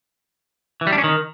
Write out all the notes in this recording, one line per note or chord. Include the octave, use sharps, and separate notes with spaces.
E3
G3
D4
C#4
D#3